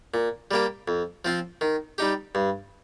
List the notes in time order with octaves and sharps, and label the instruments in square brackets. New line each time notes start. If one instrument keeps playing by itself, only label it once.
[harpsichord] A#2
G3 A#3 G4
F2
F3 C4 F4
D#3
G3 D#4 G4
G2